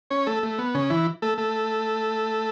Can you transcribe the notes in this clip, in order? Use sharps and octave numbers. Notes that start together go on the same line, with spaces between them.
C#4 C#5
A3 A4
A3
B3
C#3 C#4
E3 E4
A3 A4
A3 A4